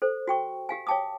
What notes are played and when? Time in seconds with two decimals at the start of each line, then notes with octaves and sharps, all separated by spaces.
0.02 A4 C5
0.28 F#4 G5 C#6
0.69 G4 F5 G#5
0.87 C#5 F5 G5 A5 D6 D#6